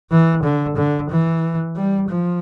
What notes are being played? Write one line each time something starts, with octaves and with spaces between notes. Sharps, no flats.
E3
D3
D3
E3
G3
F3